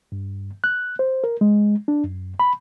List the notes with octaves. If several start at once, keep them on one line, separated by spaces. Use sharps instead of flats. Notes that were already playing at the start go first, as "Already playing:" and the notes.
G2
F#6
C5
A#4
G#3
D4
F#2
B5